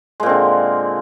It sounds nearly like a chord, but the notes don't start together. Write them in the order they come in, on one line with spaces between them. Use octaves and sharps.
G#3 A#2 C4 D3